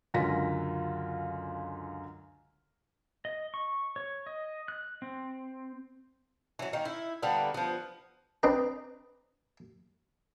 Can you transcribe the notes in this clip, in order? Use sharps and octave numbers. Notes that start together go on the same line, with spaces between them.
C#2 F#2 D3 F4 A#6 B6
D#5
C#6
C#5
D#5
F#6
C4
E3 F#3
D#3 A#3
E4
D3 G3 A#3 B3
F3 B3
C4 D4 B4 D#5 A#5